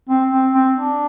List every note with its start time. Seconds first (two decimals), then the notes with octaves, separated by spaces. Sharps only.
0.09 C4
0.31 C4
0.54 C4
0.75 D4